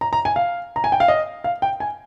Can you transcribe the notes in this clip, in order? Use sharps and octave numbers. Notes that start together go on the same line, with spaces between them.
A#5
A#5
G#5
F5
A#5
G#5
G5
F5
D#5
F5
G5
G#5